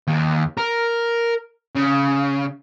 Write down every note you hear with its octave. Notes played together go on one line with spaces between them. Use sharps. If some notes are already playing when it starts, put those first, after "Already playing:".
D#2
A#4
C#3